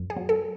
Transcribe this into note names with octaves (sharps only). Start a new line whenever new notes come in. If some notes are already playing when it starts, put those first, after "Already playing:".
Already playing: F#2
G#4
F#3
A4